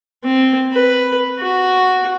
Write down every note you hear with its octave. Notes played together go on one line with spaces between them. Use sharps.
C4
B4
F#4